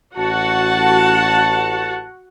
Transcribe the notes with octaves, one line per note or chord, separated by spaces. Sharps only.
A1 F#4 F#5 A5